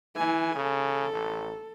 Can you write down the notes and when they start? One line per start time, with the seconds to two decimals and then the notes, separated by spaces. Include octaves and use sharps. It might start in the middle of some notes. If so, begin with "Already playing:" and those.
0.16 E3 E4 G#5
0.55 C#3 A4
1.13 A1